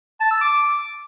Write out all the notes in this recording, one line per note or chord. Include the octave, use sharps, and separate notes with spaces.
A5
E6
D6